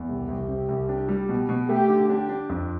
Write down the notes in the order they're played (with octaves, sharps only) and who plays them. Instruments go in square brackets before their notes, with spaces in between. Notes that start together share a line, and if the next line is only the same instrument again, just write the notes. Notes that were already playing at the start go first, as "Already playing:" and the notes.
Already playing: [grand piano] E2
[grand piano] C2 [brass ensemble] G4
[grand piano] C2
C3
C2
D4
G3
B2
B2
[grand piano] A3 [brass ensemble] G4
[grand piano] D3
[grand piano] D4 [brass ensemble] G4
[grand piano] D4
F2